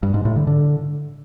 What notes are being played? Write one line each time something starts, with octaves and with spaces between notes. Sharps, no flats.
G2
G#2
A2
D3
D3